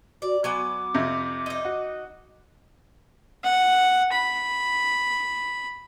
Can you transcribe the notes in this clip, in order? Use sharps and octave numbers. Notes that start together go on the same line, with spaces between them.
F#4 D5
F#3 B3 G#5 D6
F2 C3
D#4 D#5
F#4
F#5
B5